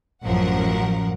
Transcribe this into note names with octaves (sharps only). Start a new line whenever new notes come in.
A1 F#2 F3 A#4 F#5